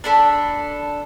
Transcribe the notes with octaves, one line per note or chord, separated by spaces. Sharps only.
D4 A4 B5